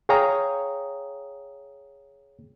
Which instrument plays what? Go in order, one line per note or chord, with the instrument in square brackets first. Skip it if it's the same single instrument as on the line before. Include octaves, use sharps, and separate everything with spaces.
[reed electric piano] G#4 C#5 F5 G5 A#5 D#6